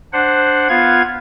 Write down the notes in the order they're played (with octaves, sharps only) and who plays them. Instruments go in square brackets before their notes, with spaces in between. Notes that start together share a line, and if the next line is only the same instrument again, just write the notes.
[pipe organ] D4 C5 F#5
B3 F4 F5 G#6